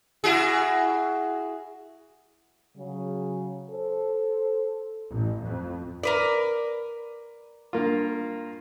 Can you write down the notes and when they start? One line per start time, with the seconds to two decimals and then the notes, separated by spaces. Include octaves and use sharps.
0.24 E4 F#4 G#4
2.76 C#3 F#3
3.69 A4 C5
5.11 A1
5.43 F2
6.03 A#4 B4 D5
7.73 G2 A#3 F4